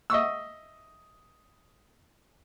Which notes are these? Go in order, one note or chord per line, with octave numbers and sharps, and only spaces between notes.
D#5 E5 C#6 E6